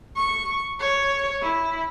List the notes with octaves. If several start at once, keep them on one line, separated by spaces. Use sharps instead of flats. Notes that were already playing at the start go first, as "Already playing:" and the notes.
C#6
C#5
E4